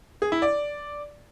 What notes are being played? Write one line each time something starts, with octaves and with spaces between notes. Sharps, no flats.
G#4
E4
D5